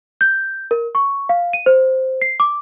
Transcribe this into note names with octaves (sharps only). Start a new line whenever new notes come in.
G6
A#4
C#6
F5
D#7
C5
C7
D6